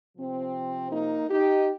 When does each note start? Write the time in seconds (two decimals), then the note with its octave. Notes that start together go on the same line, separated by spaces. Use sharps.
0.17 C3 F3 C4
0.92 A#3 D#4
1.29 D#4 G4